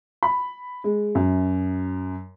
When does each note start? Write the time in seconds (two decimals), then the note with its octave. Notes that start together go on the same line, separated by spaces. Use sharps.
0.23 B5
0.84 G#3
1.15 F#2